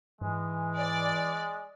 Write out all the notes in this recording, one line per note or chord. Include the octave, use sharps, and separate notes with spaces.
G#2 E3 G#3
D5